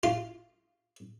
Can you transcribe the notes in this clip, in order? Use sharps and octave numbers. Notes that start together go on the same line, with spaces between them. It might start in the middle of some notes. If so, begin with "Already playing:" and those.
F4